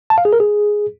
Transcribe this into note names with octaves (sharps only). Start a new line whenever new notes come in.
A5
F5
G#4
A#4
G#4